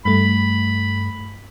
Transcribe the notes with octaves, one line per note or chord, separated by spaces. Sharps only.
G2 A3 B5